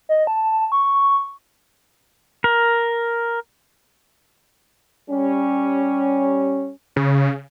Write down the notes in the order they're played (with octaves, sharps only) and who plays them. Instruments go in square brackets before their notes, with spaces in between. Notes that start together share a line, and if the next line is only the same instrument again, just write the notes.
[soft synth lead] D#5
A5
C#6
[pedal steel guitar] A#4
[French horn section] G3 C#4
[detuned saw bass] C#3